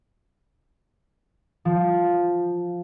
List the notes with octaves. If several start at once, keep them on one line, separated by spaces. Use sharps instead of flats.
F3